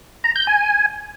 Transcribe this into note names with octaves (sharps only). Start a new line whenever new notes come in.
A#5
G6
G#5